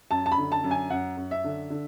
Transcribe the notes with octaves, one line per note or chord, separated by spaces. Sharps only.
F#2 A5
A5
B5
D3
A5
F#2
G#5
F#2 F#5
F#2
E5
D3
D3